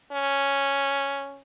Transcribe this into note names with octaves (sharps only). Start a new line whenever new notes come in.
C#4